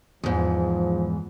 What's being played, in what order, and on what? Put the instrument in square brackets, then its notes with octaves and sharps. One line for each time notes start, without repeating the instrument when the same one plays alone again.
[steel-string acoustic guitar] E2 G#2 [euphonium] F3